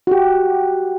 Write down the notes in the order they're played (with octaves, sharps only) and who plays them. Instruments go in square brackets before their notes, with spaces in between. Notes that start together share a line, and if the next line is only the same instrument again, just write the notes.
[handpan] F#4 G4